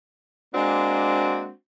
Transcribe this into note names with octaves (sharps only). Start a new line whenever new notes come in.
G#3 A#3 C4 D4 F#4